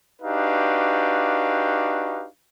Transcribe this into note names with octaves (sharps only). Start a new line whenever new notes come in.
D4 D#4 F#4 G4 B4 F5